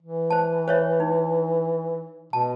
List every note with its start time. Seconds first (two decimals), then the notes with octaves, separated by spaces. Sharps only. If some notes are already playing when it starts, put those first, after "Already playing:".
0.02 E3
0.30 C5 A5
0.68 C5 C#5 E5
1.00 D#4
2.33 B2 A5